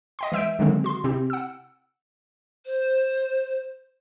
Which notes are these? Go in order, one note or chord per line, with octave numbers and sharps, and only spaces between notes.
D#5 G5 C6
E3 G#3 E5 E6 G6 D7
D3 D#3 F#3 G#3 A#3 C4
F#4 C6
C3 C4 E4 G4
F#5 E6
C5